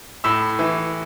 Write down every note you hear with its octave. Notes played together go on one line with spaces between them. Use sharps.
A2 E6
E3